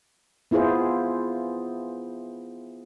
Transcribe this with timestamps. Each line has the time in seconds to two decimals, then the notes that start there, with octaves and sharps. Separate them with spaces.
0.51 B3 E4 F4 G#4 C5